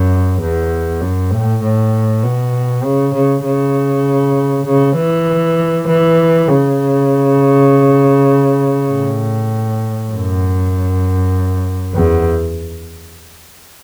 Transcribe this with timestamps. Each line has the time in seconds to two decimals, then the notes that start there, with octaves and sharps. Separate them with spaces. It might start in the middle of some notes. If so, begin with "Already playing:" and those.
Already playing: F#2
0.41 E2
1.01 F#2
1.32 A2
1.62 A2
2.23 B2
2.83 C#3
3.14 C#3
3.44 C#3
4.66 C#3
4.96 E3
5.87 E3
6.48 C#3
8.91 A2
10.12 F#2
11.94 E2